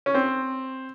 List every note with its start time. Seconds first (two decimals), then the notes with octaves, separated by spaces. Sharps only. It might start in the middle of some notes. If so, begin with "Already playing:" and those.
0.06 C#4
0.15 C4